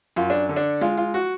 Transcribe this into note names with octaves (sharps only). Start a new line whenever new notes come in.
F#2 F4
D4
D3
D4
G#3 F4
F4
F#4